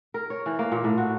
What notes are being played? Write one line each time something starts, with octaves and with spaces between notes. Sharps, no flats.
A#4
C#5
E3
A#3
A#2
A2
F#4